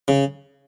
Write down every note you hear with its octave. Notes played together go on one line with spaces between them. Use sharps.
C#3